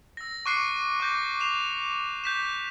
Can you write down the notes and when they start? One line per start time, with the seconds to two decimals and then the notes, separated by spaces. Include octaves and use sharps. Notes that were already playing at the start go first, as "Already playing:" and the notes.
0.17 E6 A#6
0.46 C#6 D6 F#6 C7 C#7 D#7
1.00 D6 G6 A#6
1.40 C7 E7 F7
2.24 G6 B6 E7